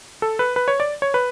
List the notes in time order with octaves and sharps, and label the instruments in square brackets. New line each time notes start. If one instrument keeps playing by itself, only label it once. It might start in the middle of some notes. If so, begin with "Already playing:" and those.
[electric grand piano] A4
B4
B4
C#5
D5
C#5
B4